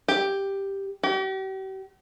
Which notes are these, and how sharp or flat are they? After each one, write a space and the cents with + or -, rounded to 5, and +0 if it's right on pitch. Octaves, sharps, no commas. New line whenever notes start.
G4 +5
G4 -40